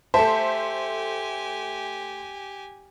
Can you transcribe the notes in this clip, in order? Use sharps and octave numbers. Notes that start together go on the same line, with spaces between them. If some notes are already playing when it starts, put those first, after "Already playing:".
A3 G4 C5 E5 G#5 A5